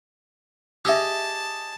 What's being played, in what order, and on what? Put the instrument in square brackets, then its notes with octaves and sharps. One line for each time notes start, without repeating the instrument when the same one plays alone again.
[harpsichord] G4 G#4 D#5 [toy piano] E5 E6 [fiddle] A5